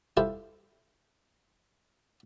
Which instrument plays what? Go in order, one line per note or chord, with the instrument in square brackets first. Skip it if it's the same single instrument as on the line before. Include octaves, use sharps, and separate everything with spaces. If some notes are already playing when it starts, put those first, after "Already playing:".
[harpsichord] E4 F4 G4 A4 C5 E5